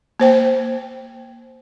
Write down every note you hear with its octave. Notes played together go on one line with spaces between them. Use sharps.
A#3 C5 G5